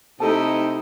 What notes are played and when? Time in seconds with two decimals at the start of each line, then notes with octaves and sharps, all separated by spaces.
0.20 C3 A3 D#4 E4 G4 A4 D#5 A5